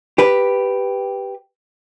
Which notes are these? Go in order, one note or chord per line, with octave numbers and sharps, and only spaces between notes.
G4 B4